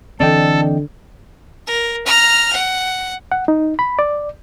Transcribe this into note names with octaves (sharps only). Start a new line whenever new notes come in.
D3 E3 C4 A4 D5 D#5 G5
A#4
A#5 F6
F#5
F#5
D#4
B5
D5